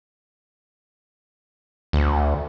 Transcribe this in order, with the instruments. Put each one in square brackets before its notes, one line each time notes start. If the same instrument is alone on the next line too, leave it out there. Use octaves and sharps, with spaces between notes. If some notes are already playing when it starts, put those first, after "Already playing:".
[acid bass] D2